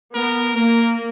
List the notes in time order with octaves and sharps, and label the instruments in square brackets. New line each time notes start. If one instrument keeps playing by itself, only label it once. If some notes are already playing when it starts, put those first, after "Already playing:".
[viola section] B3 [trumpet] A#4
[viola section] A#3 [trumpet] A#4